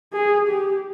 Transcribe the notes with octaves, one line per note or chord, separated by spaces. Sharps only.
G#4
G4